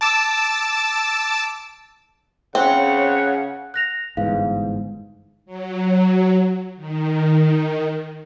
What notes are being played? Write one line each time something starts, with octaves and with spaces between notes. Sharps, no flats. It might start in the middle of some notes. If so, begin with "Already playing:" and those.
A5 D6 E6
C#3 C4 C#5 F#5
F#6 A#6 F7
G1 G#2 E3 F5
F#3
D#3